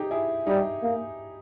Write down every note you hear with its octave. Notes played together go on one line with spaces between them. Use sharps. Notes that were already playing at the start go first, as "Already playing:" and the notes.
Already playing: D#4 G4 G#4
E4 G#4
G3 D#4 G4
A#3